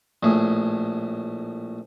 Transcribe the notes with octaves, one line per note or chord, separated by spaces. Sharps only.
A#1 A2 G#4